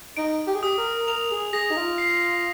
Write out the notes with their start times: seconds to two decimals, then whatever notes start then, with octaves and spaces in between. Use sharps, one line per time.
0.17 D#4 D7
0.47 G4
0.55 G#4
0.62 G4 D#6
0.78 A#4
1.07 A#4 F7
1.31 G#4
1.53 G#4 A#6
1.70 D#4
1.77 F4
1.98 C7